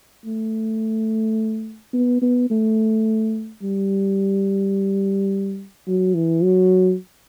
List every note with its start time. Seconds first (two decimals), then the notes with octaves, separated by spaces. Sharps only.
0.25 A3
1.93 B3
2.22 B3
2.50 A3
3.62 G3
5.87 F#3
6.14 E3
6.43 F#3